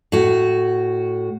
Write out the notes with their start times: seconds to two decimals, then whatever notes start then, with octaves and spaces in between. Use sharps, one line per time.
0.12 A2 F#4